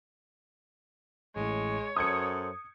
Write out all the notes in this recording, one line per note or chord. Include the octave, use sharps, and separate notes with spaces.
A1 A2 G#3 C#5
F#2 A4 C5 D#6 G#6 C#7